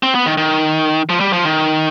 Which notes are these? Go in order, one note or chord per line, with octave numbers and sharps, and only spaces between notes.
C4
B3
D#3
D#3
F3
G3
F3
D#3